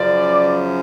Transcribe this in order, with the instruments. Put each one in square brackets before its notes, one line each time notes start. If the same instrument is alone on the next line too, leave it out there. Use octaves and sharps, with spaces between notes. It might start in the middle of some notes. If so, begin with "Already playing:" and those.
Already playing: [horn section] F#2 C#3 F3 D5